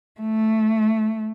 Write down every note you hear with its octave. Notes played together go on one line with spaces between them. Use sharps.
A3